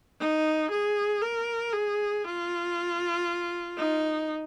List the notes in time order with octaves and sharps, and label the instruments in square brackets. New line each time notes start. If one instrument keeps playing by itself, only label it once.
[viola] D#4
G#4
A#4
G#4
F4
D#4